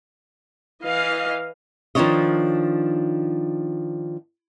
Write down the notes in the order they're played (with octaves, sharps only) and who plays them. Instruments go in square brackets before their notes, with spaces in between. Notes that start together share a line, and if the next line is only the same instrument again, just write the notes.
[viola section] E3 D#5 F5
[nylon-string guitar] D#3 F3 F#3 D4 C#5 D#5